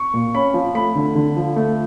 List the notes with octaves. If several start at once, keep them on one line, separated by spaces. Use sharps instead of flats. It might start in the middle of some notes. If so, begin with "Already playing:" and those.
Already playing: C#6
A#2
C#4 B5
F3
A3 B5
D3
D3
F3
A3